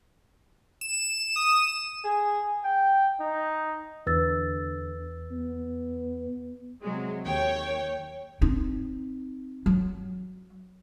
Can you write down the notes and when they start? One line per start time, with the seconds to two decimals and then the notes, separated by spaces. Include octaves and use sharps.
0.81 E7
1.36 D#6
2.04 G#4
2.64 G5
3.20 D#4
4.07 E2 D3 B4 E6 A6
5.31 B3
6.82 C3 F#3 G#3
7.24 D#2 C#5 G5
8.41 C4 D#4
9.66 F#3